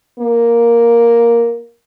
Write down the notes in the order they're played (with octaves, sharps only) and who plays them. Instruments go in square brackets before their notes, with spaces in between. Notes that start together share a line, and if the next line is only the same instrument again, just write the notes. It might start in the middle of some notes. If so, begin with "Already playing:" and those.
[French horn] A#3